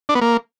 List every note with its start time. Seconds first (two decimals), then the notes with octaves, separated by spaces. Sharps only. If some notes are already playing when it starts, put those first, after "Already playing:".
0.09 D4
0.15 B3
0.21 A#3